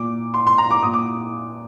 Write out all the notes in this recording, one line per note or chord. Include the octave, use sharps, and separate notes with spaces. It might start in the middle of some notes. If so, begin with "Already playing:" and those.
Already playing: A#2 D6
C6
C6
A#5
D6
A#2 D#6
D6